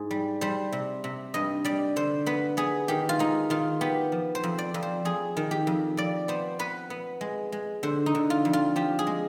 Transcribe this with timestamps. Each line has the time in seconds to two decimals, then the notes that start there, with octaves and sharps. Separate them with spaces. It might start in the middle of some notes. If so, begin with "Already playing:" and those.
Already playing: G#2 G#4
0.11 G3
0.41 G3 C5
0.72 C3
1.04 C3
1.34 G2 D#5
1.64 G3 D5
1.96 D3 C5
2.26 B3 B4
2.57 B3 G#4
2.88 D#3 G4
3.09 F4
3.19 G#3 D#4
3.50 D#3 F4
3.81 B3 G4
4.12 F3
4.35 C5
4.43 F2
4.58 D5
4.74 F2
4.82 C5
5.05 F2 G#4
5.37 D#3
5.51 G4
5.67 F2
5.97 F2 D5
6.28 B3 C5
6.59 B3 B4
6.90 B3
7.21 G#3
7.52 G#3
7.83 D3 C5
8.06 D#4
8.15 D3
8.30 F4
8.45 F2
8.53 F4
8.76 F3 G4
8.99 G#4
9.07 G#3